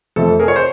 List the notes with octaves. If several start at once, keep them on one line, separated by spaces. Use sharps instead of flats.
F2 C3 F3 A3 A4
G#4 A#4
C#5
C5